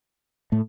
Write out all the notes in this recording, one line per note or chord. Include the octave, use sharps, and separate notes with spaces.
A2 A3